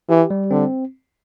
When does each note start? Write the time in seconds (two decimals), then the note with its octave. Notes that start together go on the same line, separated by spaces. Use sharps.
0.09 E3 G4
0.30 G3
0.51 D3 C4